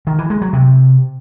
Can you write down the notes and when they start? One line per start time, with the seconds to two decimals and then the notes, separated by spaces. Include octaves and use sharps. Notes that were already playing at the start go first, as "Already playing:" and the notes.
0.07 D#3
0.18 E3
0.30 G#3
0.42 F#3
0.53 C3